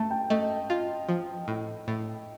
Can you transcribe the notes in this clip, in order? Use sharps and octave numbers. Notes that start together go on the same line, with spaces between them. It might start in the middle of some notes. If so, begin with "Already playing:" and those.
Already playing: A3 A5
G5
A3 D#5
F4
F3
A2
A2